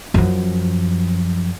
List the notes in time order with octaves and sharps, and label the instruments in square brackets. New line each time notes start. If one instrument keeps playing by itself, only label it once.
[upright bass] F#2 F3